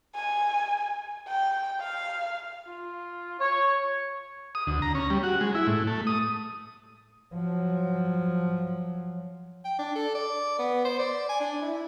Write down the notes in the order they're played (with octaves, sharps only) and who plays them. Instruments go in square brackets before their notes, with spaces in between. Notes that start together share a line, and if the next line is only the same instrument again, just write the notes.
[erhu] G#5
G5
F5
[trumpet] F4
[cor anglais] C#5 [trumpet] C#6
[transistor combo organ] D#6
D2
A#5
C#4
G3
F#4
G#3
E4
A2
A3
D#6
[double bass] F3 F#3
[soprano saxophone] G5
D4
A4
D5
B3
C5
D5
G#5
D4
E4